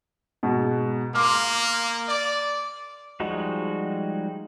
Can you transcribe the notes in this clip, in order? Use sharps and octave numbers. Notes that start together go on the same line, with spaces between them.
G#2 B2 F#4
A#3 C6 D6 F6
D5
F3 G3 G#3 D#4 F#4